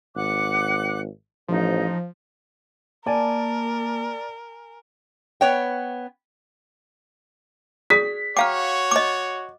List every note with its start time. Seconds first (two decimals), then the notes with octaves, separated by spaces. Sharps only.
0.16 G#1 F#5 D6 F#6
1.48 A1 F3 D#4
3.06 A#3 A#4 D5 G#5 A5
5.41 B3 C#5 G5
7.90 G#4 D5 D#6 B6
8.37 F#4 C#5 F5 G5 A#5 D6 F6
8.91 D#5 D6